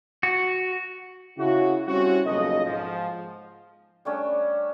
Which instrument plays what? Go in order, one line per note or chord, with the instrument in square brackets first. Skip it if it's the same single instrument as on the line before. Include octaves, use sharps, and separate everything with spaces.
[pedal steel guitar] F#4
[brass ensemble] C#3 E4 F#4
G3 C4 C#4 E4 F#4
B1 F2 C#3 A#3 D#5
G#2 F3
[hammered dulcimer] G3 A3 C#4 D4